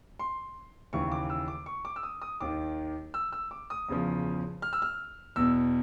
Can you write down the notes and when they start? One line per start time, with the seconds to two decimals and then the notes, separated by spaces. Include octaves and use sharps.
0.19 C6
0.93 D#2 C#3 E3 C#6
1.12 D6
1.30 E6
1.48 D6
1.66 C#6
1.85 D6
1.96 E6
2.03 D#6
2.22 D#6
2.40 D#2 D#3 D6
3.14 E6
3.32 E6
3.51 D6
3.70 D#6
3.89 E2 C#3 F3
4.62 F6
4.73 E6
4.82 F6
5.36 E2 B2 E6